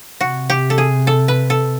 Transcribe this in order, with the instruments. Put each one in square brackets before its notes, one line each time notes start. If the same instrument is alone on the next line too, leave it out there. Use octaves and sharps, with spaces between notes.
[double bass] C3 [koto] F#4
[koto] G4
A4
G#4
A4
B4
A4